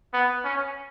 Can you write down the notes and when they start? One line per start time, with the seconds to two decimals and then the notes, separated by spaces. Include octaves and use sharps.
0.13 B3
0.44 C#4